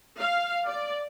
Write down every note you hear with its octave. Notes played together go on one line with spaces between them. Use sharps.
F5
D5